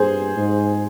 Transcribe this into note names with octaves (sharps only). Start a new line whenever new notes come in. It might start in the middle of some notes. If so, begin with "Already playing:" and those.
Already playing: G2 G#4 C5
G#2